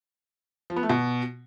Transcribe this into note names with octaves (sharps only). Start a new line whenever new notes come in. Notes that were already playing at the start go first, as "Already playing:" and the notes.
F3
B3
A3
B2